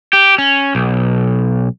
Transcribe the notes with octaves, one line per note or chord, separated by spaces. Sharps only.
G4
C#4
B1